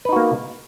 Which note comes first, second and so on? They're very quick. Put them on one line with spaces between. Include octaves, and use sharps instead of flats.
B4 D#4 F#4 A#3